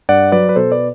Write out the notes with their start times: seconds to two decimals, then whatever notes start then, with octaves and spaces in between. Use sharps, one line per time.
0.09 G2 D5 F#5
0.32 F#3 B4 D5
0.49 B4
0.56 B2 A4 C5
0.72 B4 D5